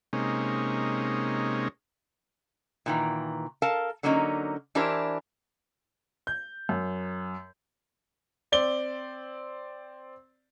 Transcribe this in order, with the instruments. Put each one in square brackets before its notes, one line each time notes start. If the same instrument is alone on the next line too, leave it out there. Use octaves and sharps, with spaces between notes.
[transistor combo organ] C3 G#3 A#3 C#4 D#4
[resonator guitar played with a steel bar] A#2 D#3 E3
A4 A#4 F5 A5
D3 F#3 A#3 C#4 D#4
E3 D4 E4 G4 A#4 C5
[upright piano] G6
F#2
[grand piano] C4 D5 G7